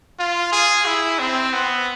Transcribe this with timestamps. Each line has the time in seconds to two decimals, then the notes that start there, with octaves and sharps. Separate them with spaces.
0.19 F4
0.52 G#4
0.86 E4
1.19 C4
1.53 B3